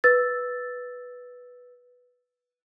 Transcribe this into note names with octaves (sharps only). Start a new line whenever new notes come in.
B4 E6 A6